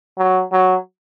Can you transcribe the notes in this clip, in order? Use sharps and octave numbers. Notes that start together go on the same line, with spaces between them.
F#3
F#3